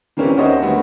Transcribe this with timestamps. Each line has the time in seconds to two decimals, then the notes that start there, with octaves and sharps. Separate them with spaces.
0.17 E3 A#3 C4 C#4 G4 B4
0.37 D#2 F#4 C5 C#5 D#5 E5
0.62 D3 G3 A3 B3 F#4